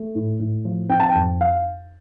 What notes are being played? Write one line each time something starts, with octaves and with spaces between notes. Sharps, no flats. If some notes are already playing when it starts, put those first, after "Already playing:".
Already playing: A3
A2
A2
F3
C4 G5
A5
G5
F2
F5